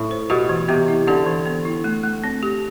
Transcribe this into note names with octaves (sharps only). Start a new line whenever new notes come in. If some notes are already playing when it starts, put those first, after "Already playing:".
Already playing: A2
C5
B2 G4
E3
C3 B3
E4
D3 G4
E3
B3
E4
A3
A3
C4
G4